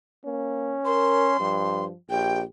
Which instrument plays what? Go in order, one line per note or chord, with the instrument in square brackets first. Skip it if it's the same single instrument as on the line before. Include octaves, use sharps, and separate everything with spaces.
[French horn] A#3 [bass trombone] C#4
[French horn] A#4 [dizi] C6
[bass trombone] G2 [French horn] F3
[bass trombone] A#1 [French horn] G4 [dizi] G5